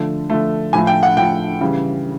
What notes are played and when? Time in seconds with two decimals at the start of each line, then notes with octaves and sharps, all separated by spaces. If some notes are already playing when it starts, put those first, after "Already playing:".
Already playing: D3 F3 A3
0.30 D3 F3 A3
0.73 A2 F3 A3 G#5
0.87 G5
1.03 F#5
1.17 A2 F3 A3 G5
1.61 C#3 E3 G3